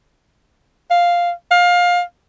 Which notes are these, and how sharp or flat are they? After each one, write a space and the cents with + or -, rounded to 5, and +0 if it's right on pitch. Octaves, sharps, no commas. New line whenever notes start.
F5 +0
F5 +20